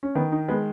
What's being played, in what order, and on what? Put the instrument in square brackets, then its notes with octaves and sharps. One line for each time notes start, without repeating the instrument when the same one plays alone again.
[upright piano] C#4
[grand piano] D#3 [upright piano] B3
[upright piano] D#4
[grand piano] G#3 [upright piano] B3